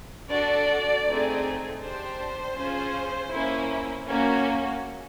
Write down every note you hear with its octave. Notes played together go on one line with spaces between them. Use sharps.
D4 F#4 A4 D5
A3 C4 D#4 G#4
D4 G4 C5
C#4 F4 G#4
A#3 C#4 E4
A#3 C#4 F#4